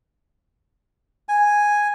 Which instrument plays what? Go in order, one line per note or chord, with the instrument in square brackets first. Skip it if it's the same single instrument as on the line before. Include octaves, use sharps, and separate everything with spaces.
[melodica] G#5